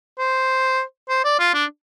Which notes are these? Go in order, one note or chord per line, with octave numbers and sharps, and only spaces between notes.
C5
C5
D5
F4
D4